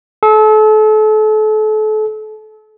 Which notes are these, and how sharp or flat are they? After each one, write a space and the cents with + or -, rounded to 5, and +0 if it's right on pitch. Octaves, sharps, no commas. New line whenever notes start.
A4 -35